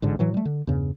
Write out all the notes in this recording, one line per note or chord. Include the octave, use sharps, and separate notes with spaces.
A1 G#2 D3
A2 E3 F#3
G3 A3
D3
E2 G2 C#3